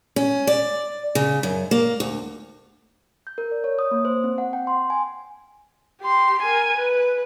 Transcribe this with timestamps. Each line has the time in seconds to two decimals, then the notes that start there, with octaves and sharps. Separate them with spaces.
0.16 C#4
0.47 D5
1.15 C#3
1.43 F#2
1.71 A#3
2.00 D2
3.27 G6
3.38 A#4
3.51 D5
3.64 C#5
3.79 D#6
3.91 A#3
4.05 C5
4.24 C4
4.38 F#5
4.53 G5
4.67 C6
4.90 G#5
6.01 G4 C6
6.43 A#4 G#5
6.77 B4